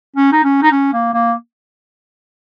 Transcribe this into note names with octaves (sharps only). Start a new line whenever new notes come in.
C#4
D#4
C#4
D#4
C#4
A#3
A#3